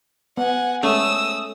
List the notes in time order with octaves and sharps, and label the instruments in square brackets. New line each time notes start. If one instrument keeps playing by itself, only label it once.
[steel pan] B3 [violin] F#5 G#5
[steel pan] G#3 C#4 [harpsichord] A3 [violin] D#6 E6